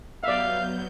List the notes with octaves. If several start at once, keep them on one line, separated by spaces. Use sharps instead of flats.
F#3 B3 D5 E5 F5 G6